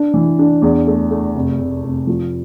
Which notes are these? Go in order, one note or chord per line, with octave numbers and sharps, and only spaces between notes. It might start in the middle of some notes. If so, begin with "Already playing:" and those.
Already playing: D4
E3
D4
E2
A3
A3
F1
F1
F1
F3